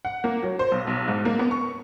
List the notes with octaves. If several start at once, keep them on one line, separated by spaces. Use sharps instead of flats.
F#5
A#3
F#3
C5
B1
B1
G#2
A#3
B3
C#6